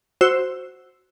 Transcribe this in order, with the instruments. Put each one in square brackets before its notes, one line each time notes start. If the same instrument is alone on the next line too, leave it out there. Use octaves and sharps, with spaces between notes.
[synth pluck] F#4 C5 E6 E7